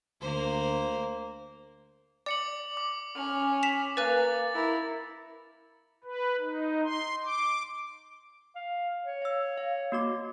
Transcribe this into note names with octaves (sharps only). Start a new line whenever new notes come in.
D2 A#3 C5
D5 D6 C#7 F#7
D6
C#4 F6
B6 E7 F7
A#3 B4 F5 G#5 F#6 A6
E4 A#4
B4
D#4
C6
D6
F5
C#5
F5 E6
F5
A#3 F#4 D6